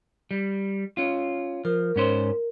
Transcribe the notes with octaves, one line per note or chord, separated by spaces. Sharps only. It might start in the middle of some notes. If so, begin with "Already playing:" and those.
G3
C#4 F4
F3 A#4
G#2 C#4 C5